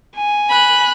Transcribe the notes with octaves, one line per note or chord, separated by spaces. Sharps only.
G#5
B5 F#6